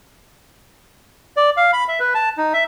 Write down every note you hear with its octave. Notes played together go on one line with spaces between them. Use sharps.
D5
F5
B5
E5
B4
A5
D#4
E5